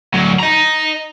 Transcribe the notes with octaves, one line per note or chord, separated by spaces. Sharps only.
D2 F#3
D#5 A#5